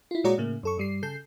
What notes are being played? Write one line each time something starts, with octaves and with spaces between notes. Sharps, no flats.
E4 F4
A#2 G#3 F#4 C#5 D5 A#5
A2 C#3 A#3
F#2 A4 C#6
G2 G3 C7
C#3 A4 G6 C7